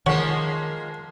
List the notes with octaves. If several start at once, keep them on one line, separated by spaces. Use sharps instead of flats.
D#3 F3 G#3 A#3 C#5 F#5